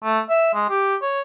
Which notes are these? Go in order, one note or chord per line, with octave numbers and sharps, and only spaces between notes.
A3
E5
G#3
G4
C#5